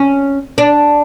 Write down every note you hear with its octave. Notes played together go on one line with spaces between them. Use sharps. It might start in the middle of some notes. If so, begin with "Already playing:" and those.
Already playing: C#4
D4